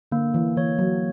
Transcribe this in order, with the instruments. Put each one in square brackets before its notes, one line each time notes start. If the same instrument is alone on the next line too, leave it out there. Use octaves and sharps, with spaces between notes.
[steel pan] D3 [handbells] A#3
[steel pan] E3
[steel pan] E3 [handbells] C#5
[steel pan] F#3